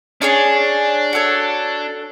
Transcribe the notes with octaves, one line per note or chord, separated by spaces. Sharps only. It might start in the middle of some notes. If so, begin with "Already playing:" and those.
C#4 D4 G#4 C#5
F#4 A4 C#5